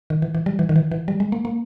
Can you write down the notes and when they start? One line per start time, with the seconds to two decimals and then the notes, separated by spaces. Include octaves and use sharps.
0.10 D#3
0.22 E3
0.35 E3
0.46 G3
0.59 E3
0.69 D#3
0.76 E3
0.92 E3
1.08 G3
1.20 G#3
1.32 A#3
1.45 A#3